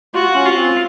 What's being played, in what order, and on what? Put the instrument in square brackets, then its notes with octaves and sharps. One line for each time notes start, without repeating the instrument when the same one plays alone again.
[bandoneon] F4 [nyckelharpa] F#4
[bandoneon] C#4
[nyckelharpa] F4
[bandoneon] C4